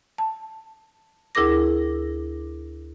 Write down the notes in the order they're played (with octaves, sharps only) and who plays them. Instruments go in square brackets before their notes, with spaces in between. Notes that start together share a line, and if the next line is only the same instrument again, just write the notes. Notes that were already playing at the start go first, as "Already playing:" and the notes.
[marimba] A5
D2 E4 G#4 A#4 D6 A#6